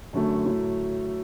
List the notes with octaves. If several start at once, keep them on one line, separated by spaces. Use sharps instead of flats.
F#2 D3 F#3 A3
A2 F#3 A3